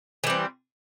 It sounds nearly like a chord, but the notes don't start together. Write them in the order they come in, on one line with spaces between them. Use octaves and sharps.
E3 G3 C4